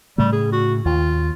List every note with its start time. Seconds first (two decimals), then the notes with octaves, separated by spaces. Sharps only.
0.18 A2 C#3 G3 A3
0.32 G#4
0.52 F#4
0.85 D#2 F4